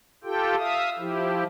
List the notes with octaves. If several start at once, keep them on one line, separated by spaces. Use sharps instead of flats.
F4 G4 A4 G5
E5 F5 D#6
F3 E4 G4